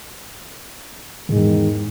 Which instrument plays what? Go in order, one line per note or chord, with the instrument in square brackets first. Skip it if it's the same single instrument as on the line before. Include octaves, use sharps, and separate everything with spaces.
[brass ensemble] E2 D#3 G#3 [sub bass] G#2